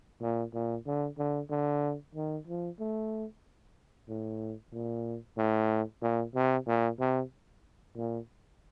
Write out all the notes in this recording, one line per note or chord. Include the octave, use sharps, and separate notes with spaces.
A#2
A#2
D3
D3
D3
D#3
F3
A3
A2
A#2
A2
A#2
C3
A#2
C3
A#2